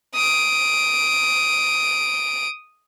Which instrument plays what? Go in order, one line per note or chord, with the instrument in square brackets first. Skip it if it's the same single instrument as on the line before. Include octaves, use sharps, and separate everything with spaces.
[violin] D#6 D7